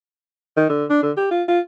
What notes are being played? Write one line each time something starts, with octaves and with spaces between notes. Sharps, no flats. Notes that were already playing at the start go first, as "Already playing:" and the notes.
D#3
D3
D4
D3
G4
F4
F4